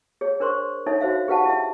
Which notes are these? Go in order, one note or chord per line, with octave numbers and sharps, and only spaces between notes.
G#4 C#5
D4 A#4 C5 C6 C#6
D4 D#4 A4 C#5 E5
D#4 F#4 C5 E5 F5
G4 G#4 B4 F5 F#5 A5
E4 E5